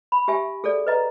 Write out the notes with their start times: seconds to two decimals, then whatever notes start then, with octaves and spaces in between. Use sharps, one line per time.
0.12 B5
0.28 G4 E5 G#5
0.64 G#4 A4 D5
0.87 B4 D#5 A#5